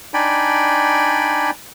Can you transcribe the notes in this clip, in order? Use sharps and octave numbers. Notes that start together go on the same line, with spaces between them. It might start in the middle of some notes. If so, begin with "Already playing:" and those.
D4 D#4 D5 G5 G#5 B5